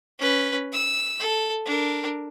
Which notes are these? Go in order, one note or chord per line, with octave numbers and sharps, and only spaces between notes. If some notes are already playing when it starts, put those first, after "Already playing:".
C#4 B4
E6
A4
D4 A#4